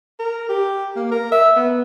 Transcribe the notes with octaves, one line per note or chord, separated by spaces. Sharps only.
A#4
G4
A#3
A#4
E5
B3